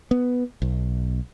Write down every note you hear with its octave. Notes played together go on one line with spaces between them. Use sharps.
B3
B1